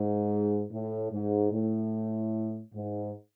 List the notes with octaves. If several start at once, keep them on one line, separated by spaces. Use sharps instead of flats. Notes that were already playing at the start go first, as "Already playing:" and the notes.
Already playing: G#2
A2
G#2
A2
G#2